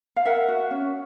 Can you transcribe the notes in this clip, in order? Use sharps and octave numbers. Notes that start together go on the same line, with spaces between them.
F5
A#4 E5 F#5
F#4
C#4